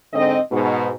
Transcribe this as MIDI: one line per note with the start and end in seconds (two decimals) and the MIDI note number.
0.13 0.37 44
0.13 0.37 50
0.13 0.37 60
0.13 0.37 75
0.52 0.91 44
0.52 0.91 47